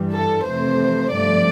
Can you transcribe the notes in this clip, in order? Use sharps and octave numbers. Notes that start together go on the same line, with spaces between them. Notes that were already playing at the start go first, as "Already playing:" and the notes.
Already playing: G2 E3 G3
A4
F2 C3 E3 A3 C5
G2 F3 A3 D5